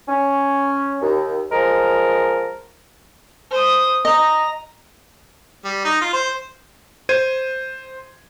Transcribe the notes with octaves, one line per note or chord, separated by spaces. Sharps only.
C#4
D#2
F3 G#3 A#4
C5 D#6
D#5 A#5
G3
D#4
F4
C5
C5 G#6 D#7